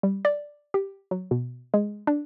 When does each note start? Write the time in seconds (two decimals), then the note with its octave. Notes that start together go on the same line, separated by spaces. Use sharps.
0.03 G3
0.25 D5
0.74 G4
1.11 F#3
1.31 B2
1.74 G#3
2.07 D4